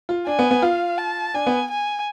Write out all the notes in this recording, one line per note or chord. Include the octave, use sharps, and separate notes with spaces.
F4
D4 G#5
B3
B3
F4 F5
A5
D4 G#5
B3
G#5